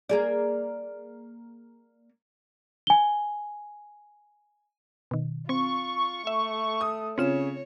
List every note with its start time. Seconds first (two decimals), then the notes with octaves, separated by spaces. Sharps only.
0.09 A#3 G#4 D5
2.87 G#5 G7
5.11 B2 D#3
5.49 C4 F4 C#6
6.27 A3 E5
6.81 D#6
7.18 C#3 C4 C#4 F4 C#5 E7